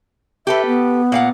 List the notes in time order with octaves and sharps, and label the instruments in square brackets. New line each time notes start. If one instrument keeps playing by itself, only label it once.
[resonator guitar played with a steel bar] G4 A4 B4 [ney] E5
[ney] B3
[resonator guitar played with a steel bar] A#2 F5 F#5